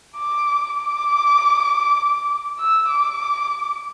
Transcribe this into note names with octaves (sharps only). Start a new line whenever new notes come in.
D6
D6
E6
D6